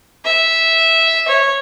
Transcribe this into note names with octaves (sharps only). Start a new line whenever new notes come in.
E5
C#5